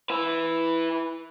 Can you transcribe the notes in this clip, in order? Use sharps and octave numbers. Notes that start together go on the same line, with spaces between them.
E4 B4